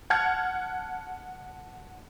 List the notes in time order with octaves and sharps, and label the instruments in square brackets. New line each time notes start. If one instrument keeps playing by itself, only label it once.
[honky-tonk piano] F#5 A5 F6 F#6 G#6 C#7